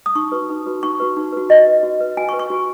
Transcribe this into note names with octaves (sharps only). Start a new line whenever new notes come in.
D#6
D#4 C#6
F#4 B4
D#4
F#4 B4
D#4 C#6
F#4 B4
D#4
F#4 B4
F#4 D#5
B4
F#4
B4
F#4 G#5
C#6
B4
C#6
F#4